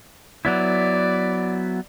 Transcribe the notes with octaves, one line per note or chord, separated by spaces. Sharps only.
F#3 B3 E4 D5